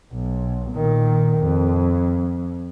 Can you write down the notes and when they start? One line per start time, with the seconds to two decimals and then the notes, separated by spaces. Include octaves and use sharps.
0.13 B1
0.71 A#2 D#3
1.38 F2